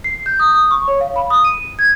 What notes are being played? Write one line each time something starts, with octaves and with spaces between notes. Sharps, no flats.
C7
G6
D#6
D#6
C#6
C#5
F5
B5
D#6
D#7
G#6